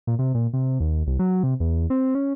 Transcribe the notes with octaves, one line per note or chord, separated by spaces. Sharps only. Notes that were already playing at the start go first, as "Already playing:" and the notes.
A#2
C3
A#2
C3
D#2
C2
F#3
C3
E2
C4
C#4